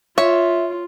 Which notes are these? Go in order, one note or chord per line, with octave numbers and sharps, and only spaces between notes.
F4 C#5 E5